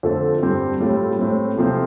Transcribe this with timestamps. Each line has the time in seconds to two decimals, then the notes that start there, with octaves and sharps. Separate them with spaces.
0.03 F2 D3 A3 F4 A4
0.42 G2 G3 C4 G4
0.80 A2 G3 F4 A4
1.19 A2 A3 C4
1.58 C3 F3 A3 C4 F4